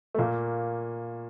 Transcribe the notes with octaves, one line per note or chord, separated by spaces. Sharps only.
A3
A#2 A#3